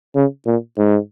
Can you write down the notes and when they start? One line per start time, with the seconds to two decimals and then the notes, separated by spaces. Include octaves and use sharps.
0.15 C#3
0.46 A#2
0.78 G#2